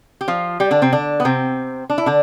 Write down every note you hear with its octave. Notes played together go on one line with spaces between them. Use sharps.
G4
F3 F4
G3 G4
D3 D4
C3 C4
D3 D4
B3
C3 C4
D4
E4
D3 D4